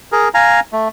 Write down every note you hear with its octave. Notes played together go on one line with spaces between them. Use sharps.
G#4 A#4
F5 G#5 A#5
A3